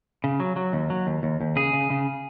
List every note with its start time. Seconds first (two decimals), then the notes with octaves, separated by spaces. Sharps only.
0.24 C#3
0.40 F#3
0.56 F#3
0.73 D#2
0.90 F#3
1.07 D#2
1.23 D#2
1.41 D#2
1.56 C#3 G#4
1.73 C#3
1.90 C#3